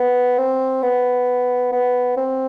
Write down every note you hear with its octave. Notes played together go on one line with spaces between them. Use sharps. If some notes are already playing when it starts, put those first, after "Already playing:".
Already playing: B3
C4
B3
B3
C4